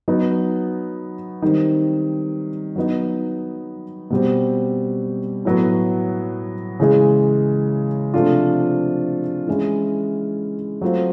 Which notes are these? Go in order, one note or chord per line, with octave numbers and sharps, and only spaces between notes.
F#3 B3 D#4
D#3 G3 C4
F#3 B3 D#4
B2 G3 C4
A2 F#3 B3
C#3 E3 G#3
C3 F3 A3 D4 F4
E3 G#3 C#4 E4
F#3 A3 C4 F4